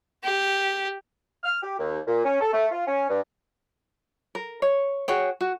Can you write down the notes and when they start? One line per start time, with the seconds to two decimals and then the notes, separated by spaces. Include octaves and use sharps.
0.24 G4
1.44 F6
1.63 G4
1.79 D#2
2.08 A#2
2.25 C#4
2.41 A4
2.53 A3
2.71 F4
2.86 C#4
3.09 G2
4.35 A#4
4.62 C#5
5.08 F#4 G#4 C#5 G5
5.41 F#4